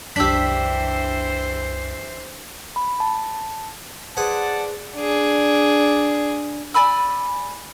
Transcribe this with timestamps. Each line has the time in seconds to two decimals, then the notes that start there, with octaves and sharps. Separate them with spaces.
0.16 C2 F#2 E3 D4 G4 C5 E6 B6
2.76 B5
3.00 A5
4.17 G#4 B4 C5 D5 F#5 A5
4.97 D4 G#4
6.74 D5 G#5 B5 E6